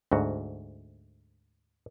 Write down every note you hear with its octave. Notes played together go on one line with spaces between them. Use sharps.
D2 G#2 F#4